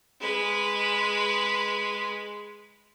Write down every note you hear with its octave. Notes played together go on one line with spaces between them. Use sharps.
G#3 B4